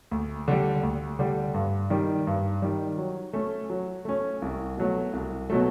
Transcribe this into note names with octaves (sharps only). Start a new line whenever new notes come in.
D2
D3 G3
D2
D3 G3
G2
D#3 G3
G2
D#3 G3
F#3
A3 C#4
F#3
A3 C#4
C2
B2 F#3 A3
C2
B2 F#3 A3